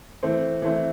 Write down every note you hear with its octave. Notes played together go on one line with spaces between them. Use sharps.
E3 A3 C4
E3 A3 C4